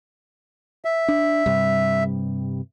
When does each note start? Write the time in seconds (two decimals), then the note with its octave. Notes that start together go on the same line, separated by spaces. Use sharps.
0.85 E5
1.08 D4
1.46 G2 C3 G3